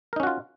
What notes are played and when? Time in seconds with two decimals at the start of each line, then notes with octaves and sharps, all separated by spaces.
0.13 A#4
0.16 D#4
0.20 C#4
0.23 F#4
0.27 F4